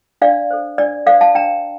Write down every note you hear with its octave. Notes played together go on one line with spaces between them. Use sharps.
D4 D5 F5
A4 C5
D4 D5
A4 C5 D5 F5
F5 A5
D4 G5 A#5